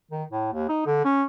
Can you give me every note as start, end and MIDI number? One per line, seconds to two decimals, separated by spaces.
0.11 0.23 51
0.30 0.50 45
0.53 0.68 39
0.69 0.83 63
0.86 1.02 50
1.04 1.23 61